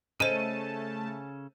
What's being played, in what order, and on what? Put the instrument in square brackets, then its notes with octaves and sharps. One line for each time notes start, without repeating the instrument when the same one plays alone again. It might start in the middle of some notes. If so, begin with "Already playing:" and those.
[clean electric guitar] C#3 C#4 A4 [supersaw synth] A3 A5 [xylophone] C5 D#5 [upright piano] D#7